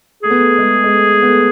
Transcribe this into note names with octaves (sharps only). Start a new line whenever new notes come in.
A3 G#4
B3
A3
G#3
G#3
A3
B3
A3